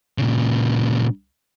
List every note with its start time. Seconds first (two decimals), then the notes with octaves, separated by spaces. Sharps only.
0.18 A#2 C#3